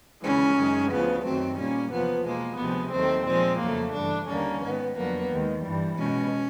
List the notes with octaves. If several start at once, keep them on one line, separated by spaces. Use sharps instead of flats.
D#2 C#3 E3 G#3 C#4
F#2 D#3 G#3
D2 C#3 F3 B3
F#2 D#3 F#3 A3 C4
A#2 G3 A#3 C#4
E2 C3 F3 A#3 B3
B2 G#3 A#3
D2 C3 F3 G#3 B3
D#2 D#3 F#3 A3 C4
A#2 F3 G#3 C4
F2 C#3 F#3 A3 A#3
G2 E3 A3 D4
D#2 D3 G3 A#3 C#4
G#2 D#3 G#3 B3
F2 D3 F#3 A#3 B3
D#2 D#3 G#3
G2 E3 G3
B2 G#3 C#4